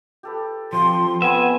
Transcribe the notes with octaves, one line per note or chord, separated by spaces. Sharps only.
G4 A4 B4
F3 C4 F4 G4 C6
B3 E5 G5 G#5